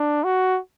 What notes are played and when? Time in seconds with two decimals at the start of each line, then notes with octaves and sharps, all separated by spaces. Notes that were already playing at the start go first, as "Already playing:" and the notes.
Already playing: D4
0.24 F#4